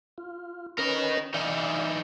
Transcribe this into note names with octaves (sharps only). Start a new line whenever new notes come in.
F4
C#4 A#4 B4 D#5
E3 D#4 D5 E5 F5